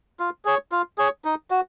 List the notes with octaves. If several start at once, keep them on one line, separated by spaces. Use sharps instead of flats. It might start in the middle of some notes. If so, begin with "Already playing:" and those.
F4
G#4 C#5
F4
G#4 C#5
D#4
F#4